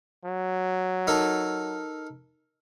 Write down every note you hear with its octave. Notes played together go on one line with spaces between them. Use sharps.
F#3
D#4 A4 A#4